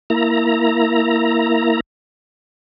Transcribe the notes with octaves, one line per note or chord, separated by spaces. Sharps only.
A#3 E4 A#5